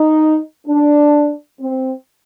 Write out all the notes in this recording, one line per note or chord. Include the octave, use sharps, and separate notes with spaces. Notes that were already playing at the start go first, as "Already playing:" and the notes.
Already playing: D#4
D4
C4